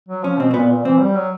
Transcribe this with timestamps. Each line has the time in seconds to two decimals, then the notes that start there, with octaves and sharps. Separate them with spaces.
0.09 F#3
0.24 F3 C#4
0.39 B2 C4
0.51 C4
0.54 A#2 B3
0.69 A#2
0.85 E3 C4
1.00 G3
1.15 F#3